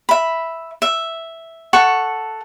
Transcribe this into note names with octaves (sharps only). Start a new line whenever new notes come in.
E5 B5
E5
A4 F#5 C#6